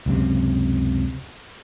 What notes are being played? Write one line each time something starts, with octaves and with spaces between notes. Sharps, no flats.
C#2 F#2 C3